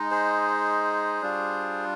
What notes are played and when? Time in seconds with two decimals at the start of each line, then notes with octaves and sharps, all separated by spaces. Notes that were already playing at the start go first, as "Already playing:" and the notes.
Already playing: G#3 D#4
0.11 G#4 C5
1.22 G3 D4 F4